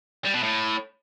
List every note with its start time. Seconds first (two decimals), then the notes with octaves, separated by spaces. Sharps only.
0.25 G3
0.34 B2
0.43 A2